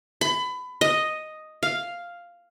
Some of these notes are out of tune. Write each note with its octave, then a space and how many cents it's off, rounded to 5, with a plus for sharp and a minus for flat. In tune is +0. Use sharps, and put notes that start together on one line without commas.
B5 +25
D#5 +0
F5 +0